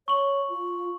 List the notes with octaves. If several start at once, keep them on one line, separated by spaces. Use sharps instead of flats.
C#5 C#6 F#7
F4